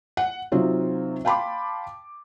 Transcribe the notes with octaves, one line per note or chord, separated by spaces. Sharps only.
F#5
C3 F#3 C4 D#4 F4
F5 G5 A5 B5 C6 D6